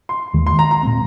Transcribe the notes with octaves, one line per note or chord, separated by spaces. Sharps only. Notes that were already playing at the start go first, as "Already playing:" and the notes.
C6
D#2 D#3 G#3
C6
A#5
A#5
A#2 G#3 C4